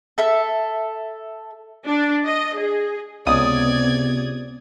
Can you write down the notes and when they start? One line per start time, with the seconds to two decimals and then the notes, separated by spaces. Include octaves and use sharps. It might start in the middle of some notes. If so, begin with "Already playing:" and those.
0.18 A4 E5 E6
1.87 D4
2.26 D#5
2.58 G#4
3.26 C#2 C3 B3 D5 D#6 G#6